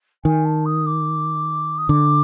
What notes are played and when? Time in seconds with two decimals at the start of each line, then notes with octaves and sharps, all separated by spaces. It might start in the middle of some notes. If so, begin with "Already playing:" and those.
0.24 D#3 G#5
0.45 A5
0.65 D#6
0.86 D6
1.78 D#6
1.89 D3 D6